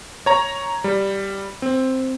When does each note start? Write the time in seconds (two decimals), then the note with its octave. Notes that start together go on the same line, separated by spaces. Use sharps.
0.26 C#5 A#5
0.84 G3
1.62 C4